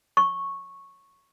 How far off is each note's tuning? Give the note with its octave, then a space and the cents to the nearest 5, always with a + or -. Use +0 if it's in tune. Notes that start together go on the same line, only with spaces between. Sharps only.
C#6 -10